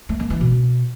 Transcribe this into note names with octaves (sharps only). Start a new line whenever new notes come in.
A3
A#3
E3
B2